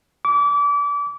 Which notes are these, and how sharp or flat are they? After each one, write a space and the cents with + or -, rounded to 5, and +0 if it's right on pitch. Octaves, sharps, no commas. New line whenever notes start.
D6 -30